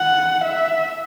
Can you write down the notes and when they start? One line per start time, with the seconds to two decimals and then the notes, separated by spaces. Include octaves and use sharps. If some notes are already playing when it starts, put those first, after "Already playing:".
Already playing: F#5
0.44 E5